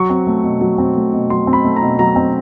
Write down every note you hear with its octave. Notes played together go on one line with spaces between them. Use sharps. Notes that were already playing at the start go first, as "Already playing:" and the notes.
Already playing: F#3 C#6
C4
A3
B2
F#3
C4
A3
B2
F#3 C6
C4
B5
A3
A#5
B2
F#3 A#5
C4